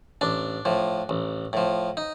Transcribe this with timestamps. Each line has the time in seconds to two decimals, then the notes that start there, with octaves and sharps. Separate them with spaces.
0.21 A1 D4
0.65 A2 F3
1.09 A1
1.53 A2 F3
1.97 D#4